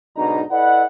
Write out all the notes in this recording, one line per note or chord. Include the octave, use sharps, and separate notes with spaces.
B1 G#2 B2 D4 D#4 A#5
E4 A4 B4 D5 D#5 F#5